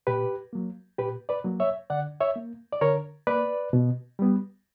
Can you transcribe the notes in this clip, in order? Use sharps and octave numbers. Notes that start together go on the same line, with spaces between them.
A#2 G4 B4
F#3 A#3
A#2 G4 B4
B4 D5
F#3 A#3
C#5 E5
D3 D5 F#5
C#5 E5
A#3
D5
D3 A#4 C#5
A#3 B4 D5
B2
G3 B3